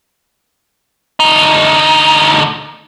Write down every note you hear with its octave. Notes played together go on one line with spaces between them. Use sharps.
D2 D#4